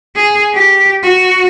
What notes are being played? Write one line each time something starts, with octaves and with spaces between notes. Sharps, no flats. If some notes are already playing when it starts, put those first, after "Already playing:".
G#4
G4
F#4